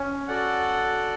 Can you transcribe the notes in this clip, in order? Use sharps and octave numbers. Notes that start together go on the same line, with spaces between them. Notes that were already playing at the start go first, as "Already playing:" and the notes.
Already playing: C#4
F#4 A4 D5 F#5